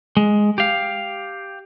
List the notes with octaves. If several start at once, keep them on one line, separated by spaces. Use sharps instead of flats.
G#3
G4 F5